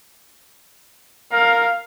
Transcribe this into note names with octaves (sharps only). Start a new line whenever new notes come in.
A#4 F5